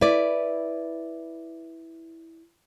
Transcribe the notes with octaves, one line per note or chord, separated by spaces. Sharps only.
E4 B4 D5